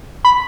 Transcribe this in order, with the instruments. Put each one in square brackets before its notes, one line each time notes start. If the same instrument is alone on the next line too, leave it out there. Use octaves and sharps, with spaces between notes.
[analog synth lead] B5